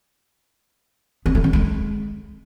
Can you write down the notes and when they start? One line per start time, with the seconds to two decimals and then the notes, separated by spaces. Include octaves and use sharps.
1.26 B3
1.35 A3
1.44 C#4
1.53 G#3